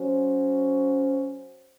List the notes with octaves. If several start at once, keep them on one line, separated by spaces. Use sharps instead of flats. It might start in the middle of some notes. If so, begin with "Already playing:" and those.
Already playing: F#3 C#4 F#4 C5